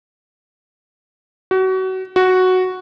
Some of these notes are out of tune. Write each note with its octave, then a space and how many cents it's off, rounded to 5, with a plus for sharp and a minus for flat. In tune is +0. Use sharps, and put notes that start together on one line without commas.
F#4 +30
F#4 +0